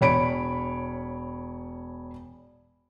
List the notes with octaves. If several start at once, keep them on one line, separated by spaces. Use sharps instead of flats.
E1 C#5 B5 D7